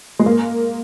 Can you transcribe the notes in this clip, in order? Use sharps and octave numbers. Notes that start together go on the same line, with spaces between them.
G#3
A#3